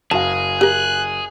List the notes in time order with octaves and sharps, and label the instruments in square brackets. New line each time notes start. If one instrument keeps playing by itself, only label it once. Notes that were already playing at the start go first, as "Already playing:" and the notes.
[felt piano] F#1 F#4 F5 [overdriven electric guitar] G#4 [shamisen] A5
[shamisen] G4 A#4 [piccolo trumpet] F#6